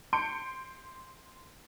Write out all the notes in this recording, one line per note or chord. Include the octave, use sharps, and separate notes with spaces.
C6 G6 C#7 D7